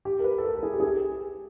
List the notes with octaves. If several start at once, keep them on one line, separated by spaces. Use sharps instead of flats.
G4
A#4
B4
A4
A#4
A4
G#4
G4
G#4
G4